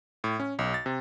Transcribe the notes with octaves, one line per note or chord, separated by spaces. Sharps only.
A2
C#4
B1
A6
C3